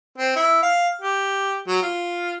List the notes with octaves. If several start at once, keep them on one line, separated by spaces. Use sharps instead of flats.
C4
E4
F5
G4
F#3
F4